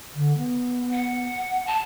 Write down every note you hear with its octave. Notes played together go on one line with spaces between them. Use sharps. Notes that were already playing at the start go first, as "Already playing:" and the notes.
D3
B3
F#5
A5